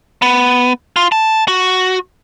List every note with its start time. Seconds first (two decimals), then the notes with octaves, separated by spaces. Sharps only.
0.22 B3
0.96 F4
1.12 A5
1.48 F#4